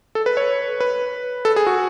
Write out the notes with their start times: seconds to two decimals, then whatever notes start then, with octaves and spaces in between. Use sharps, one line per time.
0.15 A4
0.26 B4
0.37 C#5
0.80 B4
1.45 A4
1.56 G#4
1.67 F#4